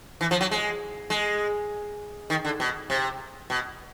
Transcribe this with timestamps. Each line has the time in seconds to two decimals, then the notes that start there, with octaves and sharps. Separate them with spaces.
0.21 E3
0.31 F3
0.41 F#3
0.51 G#3
1.10 G#3
2.30 D#3
2.45 D3
2.60 B2
2.90 C3
3.50 B2